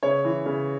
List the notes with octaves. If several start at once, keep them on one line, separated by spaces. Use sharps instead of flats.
C#3 C#5
E3
C#3